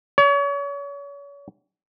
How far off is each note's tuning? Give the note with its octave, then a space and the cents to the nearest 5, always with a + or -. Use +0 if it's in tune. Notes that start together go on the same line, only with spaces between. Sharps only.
C#5 +35